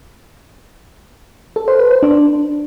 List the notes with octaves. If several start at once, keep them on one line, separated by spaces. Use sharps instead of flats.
A4
C5
B4
C5
D4